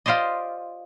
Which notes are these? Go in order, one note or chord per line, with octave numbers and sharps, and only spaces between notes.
F4 G4 C5 D5 D#5